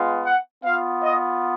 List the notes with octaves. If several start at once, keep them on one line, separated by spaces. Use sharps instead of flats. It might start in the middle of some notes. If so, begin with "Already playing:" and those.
Already playing: G#3 B3 F4
F#5
B3 F4 F5
D#5